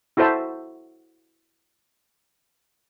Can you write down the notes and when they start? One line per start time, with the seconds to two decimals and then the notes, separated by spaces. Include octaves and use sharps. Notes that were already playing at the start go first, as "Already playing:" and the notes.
0.17 E4 F#4 A4 C5 E5 A5